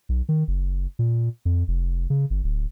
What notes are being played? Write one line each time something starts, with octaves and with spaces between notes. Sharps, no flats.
B1
D#3
F#1
A#2
F2
F1
C#3
G1
D1